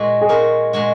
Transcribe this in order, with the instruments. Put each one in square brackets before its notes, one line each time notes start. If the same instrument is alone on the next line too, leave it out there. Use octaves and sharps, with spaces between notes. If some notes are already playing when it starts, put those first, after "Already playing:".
Already playing: [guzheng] A#2 G#3 F#4
[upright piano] G#4
[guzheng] A#2 G#3 F#4 [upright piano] A#4
[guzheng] A#2 G#3 F#4